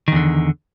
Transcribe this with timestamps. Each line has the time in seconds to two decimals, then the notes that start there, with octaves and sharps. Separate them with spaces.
0.08 D#3
0.12 E2
0.16 D3